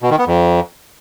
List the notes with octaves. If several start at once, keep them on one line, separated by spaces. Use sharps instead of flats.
B2
D#3
B3
F2